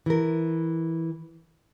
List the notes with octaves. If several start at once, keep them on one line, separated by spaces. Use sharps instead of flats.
E3 A#4